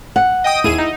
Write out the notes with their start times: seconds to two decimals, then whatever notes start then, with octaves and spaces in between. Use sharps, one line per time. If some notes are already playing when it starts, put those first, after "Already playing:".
0.16 F#5
0.44 D#5 G5 D#6
0.64 D#2 E4 G#4 D#7
0.78 D#4